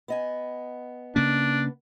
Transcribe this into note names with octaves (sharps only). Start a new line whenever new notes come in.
B3 D#5 G#5
C#3 A#3 C#4 D4